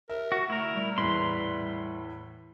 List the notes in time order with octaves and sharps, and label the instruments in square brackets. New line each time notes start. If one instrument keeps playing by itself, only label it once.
[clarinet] A#4 [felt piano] E5
[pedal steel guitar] F#4
[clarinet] A3 [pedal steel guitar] E4 A#4
[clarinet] G3
[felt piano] E2 A2 [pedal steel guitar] B4 C6